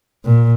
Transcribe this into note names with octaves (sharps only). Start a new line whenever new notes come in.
A#2